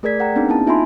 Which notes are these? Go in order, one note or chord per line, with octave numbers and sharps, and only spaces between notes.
A3 G#4 A#4 D5 G#6 B6
A#4 F#5 G5 A#5
B3 C4 D4 D#4 G#4
A#3 C#4 E4 A5
D#4 F4 E5 G#5 B5 C6